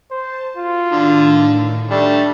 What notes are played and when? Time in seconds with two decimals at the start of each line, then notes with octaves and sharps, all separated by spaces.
0.11 C5 A5
0.57 F4 F#4 A4
0.92 A2 D3 D#3
1.91 G3 A3 D4